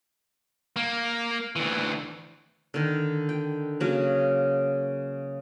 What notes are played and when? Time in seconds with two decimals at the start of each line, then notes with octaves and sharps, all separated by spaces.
0.76 A#3
1.56 D2 E3
2.74 D3 D#3
3.29 G5
3.80 C#3 F#3 A#3